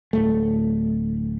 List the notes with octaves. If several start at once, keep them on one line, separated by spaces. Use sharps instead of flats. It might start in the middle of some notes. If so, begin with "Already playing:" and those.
D1 A3